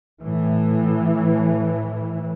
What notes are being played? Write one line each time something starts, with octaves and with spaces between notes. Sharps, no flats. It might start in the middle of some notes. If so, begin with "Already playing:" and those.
A2 E3